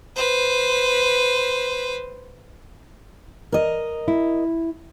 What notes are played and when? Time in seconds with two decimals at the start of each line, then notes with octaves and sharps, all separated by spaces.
0.16 B4 C5
3.52 A#4 D#5
4.08 E4